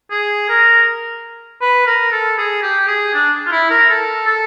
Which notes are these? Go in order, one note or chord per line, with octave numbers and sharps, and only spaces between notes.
G#4
A#4
B4
A#4
A4
G#4
G4
G#4
D4
F4
E4
A#4
A4
A4